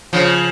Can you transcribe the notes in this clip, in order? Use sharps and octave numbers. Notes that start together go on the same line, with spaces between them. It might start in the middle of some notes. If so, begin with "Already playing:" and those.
C#3 F3